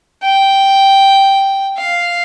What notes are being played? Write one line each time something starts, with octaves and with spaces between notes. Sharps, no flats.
G5
F5